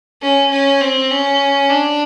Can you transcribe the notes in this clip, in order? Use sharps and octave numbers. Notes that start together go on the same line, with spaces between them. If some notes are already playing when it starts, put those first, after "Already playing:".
C#4
C#4
C4
C#4
D4